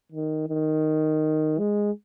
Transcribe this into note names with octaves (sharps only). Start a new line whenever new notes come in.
D#3
D#3
G#3